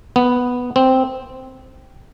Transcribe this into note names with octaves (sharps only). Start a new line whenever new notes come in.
B3
C4